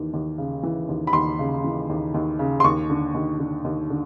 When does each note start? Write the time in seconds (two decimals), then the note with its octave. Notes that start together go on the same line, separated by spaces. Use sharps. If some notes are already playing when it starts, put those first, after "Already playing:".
Already playing: D#2 E3
0.13 D#2
0.38 C#3
0.63 E3
0.89 D#2
1.07 B5
1.13 D#2 C6
1.39 C#3
1.64 E3
1.89 D#2
2.14 D#2
2.39 C#3
2.60 C6
2.64 D#2 C#6
2.90 D3
3.14 D#2
3.40 D3
3.64 D#2
3.90 D3